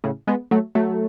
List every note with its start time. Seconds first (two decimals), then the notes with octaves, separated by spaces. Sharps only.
0.04 A2 C#3
0.27 G#3 B3
0.51 F#3 A3
0.75 F#3 A3